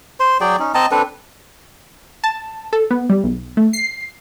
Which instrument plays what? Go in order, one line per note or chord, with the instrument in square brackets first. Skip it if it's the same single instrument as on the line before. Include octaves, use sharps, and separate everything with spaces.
[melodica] C5 C6
F#3 G#4 D5 G5
C#4 D#4
C4 D#5 A5 A#5
C4 D4 A4 B4
[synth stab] A5
A4
B3
G3
B1
A3
C7